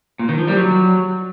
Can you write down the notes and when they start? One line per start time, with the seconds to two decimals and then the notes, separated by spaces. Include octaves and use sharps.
0.19 A#2
0.29 D#3
0.38 F3
0.47 G3
0.57 F#3